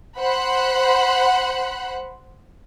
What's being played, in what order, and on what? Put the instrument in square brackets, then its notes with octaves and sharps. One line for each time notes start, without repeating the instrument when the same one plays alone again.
[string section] C5 F#5 B5